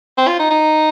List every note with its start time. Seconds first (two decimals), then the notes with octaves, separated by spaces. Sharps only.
0.18 C4
0.28 F4
0.39 D#4
0.50 D#4